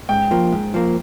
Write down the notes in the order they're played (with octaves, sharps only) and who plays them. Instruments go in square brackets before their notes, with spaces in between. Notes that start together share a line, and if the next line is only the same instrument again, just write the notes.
[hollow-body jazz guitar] G#2 [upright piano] G5
[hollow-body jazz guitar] F3 A#3
G#2
F3 A#3